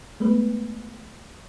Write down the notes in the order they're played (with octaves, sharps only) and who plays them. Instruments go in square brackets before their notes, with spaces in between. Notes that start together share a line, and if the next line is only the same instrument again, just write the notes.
[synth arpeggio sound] G#3 A3 B3 B4